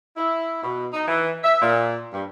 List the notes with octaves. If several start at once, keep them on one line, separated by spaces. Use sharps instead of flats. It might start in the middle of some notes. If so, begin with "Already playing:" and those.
E4
B2
D#4
E3
E5
A#2
G2